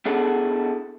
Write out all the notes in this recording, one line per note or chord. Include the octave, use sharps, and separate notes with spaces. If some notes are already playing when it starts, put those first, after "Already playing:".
B3 D4 E4 G#4 A4 F#5